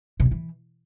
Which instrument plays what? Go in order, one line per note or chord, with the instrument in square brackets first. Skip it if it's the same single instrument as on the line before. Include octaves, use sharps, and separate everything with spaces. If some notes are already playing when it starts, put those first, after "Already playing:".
[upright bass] B2
G3
E3